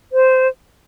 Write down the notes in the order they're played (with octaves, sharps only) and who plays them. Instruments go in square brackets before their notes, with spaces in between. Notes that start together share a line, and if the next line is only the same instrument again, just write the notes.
[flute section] C5